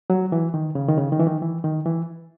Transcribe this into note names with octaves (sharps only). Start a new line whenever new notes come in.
F#3
E3
D#3
C#3
D#3
C#3
D#3
E3
D#3
E3
D#3
E3